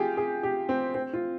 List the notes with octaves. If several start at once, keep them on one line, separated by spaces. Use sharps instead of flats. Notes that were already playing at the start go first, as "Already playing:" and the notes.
Already playing: F4 G4 G#4
G#4
G4
C4
C4
F4